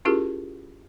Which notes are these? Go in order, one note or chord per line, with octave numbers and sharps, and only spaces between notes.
C#4 E4 F4 G4 G#4 A#4